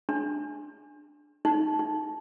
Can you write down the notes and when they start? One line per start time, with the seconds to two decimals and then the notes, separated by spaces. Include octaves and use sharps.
0.09 D4
1.45 D#4
1.79 D#4